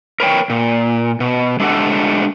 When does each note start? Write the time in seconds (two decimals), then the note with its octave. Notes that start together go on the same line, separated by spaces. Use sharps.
0.20 A#4 B4 C#5 G5
0.50 A#2
1.20 B2
1.60 G#3 A3 D4 G4 A4 F#5